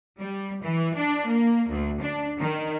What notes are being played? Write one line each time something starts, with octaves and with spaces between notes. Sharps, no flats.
G3
E3
D4
A#3
D2
D4
D#3